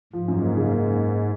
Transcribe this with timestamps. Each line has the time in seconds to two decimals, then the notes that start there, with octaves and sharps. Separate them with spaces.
0.13 G#2 F3
0.28 F#2
0.42 A#3
0.57 C#3
0.71 A#3